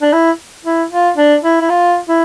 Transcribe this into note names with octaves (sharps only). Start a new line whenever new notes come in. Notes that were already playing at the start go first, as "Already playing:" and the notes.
D4
E4
E4
F4
D4
E4
E4
F4
E4